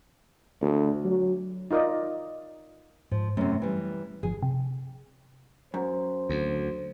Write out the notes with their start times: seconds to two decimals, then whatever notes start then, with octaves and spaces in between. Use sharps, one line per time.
0.61 D2
1.04 F#3
1.71 D#4 F4 A#4 D5 D#5
3.11 G#2 F3
3.37 F#2 C3 A3
3.62 E3 G3
4.23 G1 F3 G#4
4.43 C3
5.74 F#2 C5
6.29 D2